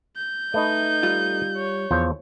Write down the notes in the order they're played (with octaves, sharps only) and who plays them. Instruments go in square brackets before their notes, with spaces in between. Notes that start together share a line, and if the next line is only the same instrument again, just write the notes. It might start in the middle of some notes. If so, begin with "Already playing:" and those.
[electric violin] G6
[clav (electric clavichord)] A3 B4 D#5 [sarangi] D#4
[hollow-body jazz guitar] G3 F4
[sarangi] C#5
[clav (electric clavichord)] E2 F3 C5